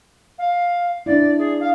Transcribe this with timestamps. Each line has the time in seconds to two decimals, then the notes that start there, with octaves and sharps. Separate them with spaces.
0.38 F5
1.06 D4 E4 D5
1.38 G#4
1.60 F5